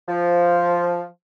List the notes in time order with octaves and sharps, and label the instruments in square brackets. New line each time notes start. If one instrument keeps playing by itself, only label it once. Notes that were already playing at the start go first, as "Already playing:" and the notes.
[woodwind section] F3